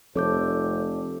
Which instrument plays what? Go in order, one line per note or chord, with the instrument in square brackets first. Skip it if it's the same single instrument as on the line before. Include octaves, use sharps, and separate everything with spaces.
[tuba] F1 [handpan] F3 C4 A4 [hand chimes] C#5 D6 G6